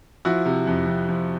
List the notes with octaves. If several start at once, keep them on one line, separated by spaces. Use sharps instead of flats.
F3 E4 F#4
C3
F2
F2
F3